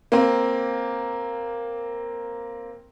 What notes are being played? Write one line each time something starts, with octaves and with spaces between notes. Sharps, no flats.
A#3 C4